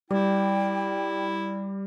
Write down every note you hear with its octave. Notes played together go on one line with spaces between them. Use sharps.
G3 E4 D5 G5